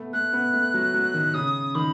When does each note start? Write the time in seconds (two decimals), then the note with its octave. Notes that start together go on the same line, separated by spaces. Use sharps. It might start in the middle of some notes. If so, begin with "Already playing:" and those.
Already playing: A3 B3
0.13 A3 F#6
0.33 B3
0.54 A3
0.74 F#3
0.94 F#3
1.14 D#3
1.34 C#3 D#6
1.75 D#3 B5